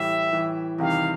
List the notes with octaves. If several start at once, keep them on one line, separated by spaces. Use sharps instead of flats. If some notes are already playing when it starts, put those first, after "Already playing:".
Already playing: A2 E3 G3 E5
A2 E3 G3
E2 C3 D#3 G3 F5